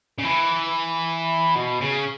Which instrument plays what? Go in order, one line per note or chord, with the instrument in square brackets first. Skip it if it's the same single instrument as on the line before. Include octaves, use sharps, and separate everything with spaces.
[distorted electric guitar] C#3
E3
B2
C#3